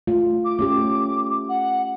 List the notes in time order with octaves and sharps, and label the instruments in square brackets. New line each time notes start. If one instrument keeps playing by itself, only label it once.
[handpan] A3 F4
[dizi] D6
[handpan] A3 C#4 G4
[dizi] F#5